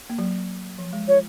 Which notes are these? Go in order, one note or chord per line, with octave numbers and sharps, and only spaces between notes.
A#3
F#3
F3
G#3
F4 C#5